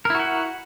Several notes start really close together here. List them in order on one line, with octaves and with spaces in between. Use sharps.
A#4 E4 F#4 F#5